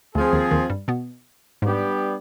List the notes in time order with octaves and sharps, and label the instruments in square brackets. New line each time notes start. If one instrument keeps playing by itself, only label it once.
[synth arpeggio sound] D2 D3 [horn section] F3 C4 F4 G#4
[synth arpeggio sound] D#2 D#3
D#2 D#3
G2 G3
B2 B3
[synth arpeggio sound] G#2 G#3 [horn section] G3 B3 D4 G4